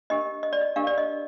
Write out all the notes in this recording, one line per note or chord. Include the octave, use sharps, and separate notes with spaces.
D4 G4 A#4 D#5
D#5
D5
D#5
D4 G4 A#4 F5
D5
D#5